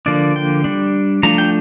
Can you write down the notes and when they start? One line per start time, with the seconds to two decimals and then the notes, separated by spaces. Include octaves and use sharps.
0.06 D3 F3 A#3 D4 D5
0.36 G5
0.64 G3 D4
1.23 F3 A3 D4 A#5
1.38 G5